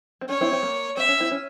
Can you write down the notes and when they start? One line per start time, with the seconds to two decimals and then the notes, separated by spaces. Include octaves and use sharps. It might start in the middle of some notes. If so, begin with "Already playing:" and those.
0.21 C4
0.29 C#4 C#5
0.41 C4 E4
0.53 C4
0.63 A#3
0.97 C4 E5
1.08 C#4
1.20 C4 E4
1.31 C#4